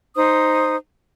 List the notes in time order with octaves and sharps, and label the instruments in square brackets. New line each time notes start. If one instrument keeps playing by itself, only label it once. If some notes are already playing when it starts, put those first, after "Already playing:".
[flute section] D#4 C5 D#6